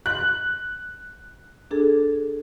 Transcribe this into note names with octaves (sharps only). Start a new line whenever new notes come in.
C6 F#6
D4 G#4 A4